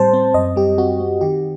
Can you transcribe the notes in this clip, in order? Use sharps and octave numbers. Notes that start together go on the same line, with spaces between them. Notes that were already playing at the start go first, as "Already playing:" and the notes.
Already playing: A2 G3 C4 C5 A5
C4
F#2 D#5
G3 G4
C4 F#4
C4
D#3 G4